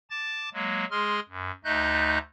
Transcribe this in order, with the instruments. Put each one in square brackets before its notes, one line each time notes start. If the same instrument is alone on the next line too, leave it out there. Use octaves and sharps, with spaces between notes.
[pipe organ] A5 D6 A6
F#3 G#3 A#3
G#3 G#4 C6 F6
F#2
D2 A3 D#4 D#5 F#6 G6